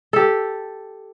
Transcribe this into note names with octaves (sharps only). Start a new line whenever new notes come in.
G4 A4